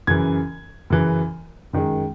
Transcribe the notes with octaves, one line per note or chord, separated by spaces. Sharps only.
F#2 C#3 E3 G#6
F#2 C#3 E3
F#2 D#3 G#3